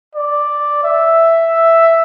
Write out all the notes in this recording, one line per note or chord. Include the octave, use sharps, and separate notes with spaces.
D5
E5